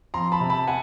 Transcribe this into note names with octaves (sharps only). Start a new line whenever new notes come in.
F2 A#5 C6
A5 B5
C3
A5 B5
F#5 G#5